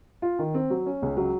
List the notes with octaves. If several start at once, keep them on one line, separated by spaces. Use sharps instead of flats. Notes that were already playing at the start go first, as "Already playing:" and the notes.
F4
D#3
C4
F#3
C#4
C#2
F#3